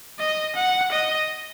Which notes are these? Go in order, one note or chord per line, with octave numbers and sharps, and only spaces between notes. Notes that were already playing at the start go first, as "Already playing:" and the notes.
D#5
F#5
D#5